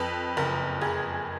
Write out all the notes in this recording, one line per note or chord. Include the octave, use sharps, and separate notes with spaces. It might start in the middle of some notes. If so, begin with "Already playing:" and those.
Already playing: F2 B4
F#1 A#4
F#1 G#4